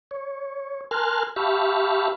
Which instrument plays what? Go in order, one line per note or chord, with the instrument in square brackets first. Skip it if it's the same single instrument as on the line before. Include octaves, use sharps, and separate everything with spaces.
[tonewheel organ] C#5
A#4 G#5 A5 C6 F6 F#6
G4 E5 F5 A5 B5 C#6